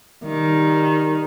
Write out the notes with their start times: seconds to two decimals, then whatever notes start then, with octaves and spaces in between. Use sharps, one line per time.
0.24 D#3 G3